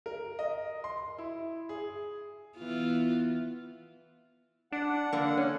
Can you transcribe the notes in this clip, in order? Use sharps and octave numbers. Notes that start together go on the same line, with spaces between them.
A#4
D#5
C6
E4
G#4
E3 B3 F4
D4 F#5
D3 A#3
C#4